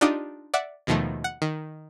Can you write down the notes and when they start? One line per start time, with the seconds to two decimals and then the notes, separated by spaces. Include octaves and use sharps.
0.01 D4 D#4 F4 G4 D5 D#5
0.54 D5 E5 F#5
0.87 D#2 B2 D#3 F3 A3
1.24 F#5
1.42 D#3